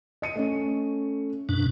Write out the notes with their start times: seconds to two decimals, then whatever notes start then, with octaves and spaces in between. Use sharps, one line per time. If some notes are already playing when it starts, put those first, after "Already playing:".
0.22 D#5 C#7 D#7
0.35 A3 C#4
1.49 F#2 B2 D4